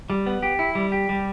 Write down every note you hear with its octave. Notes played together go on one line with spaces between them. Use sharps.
G3
B3
G4
E4
G3
G4
G3